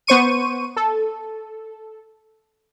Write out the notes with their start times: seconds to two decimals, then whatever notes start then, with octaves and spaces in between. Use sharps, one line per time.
0.07 B3 C5 C#6 D#7
0.76 A4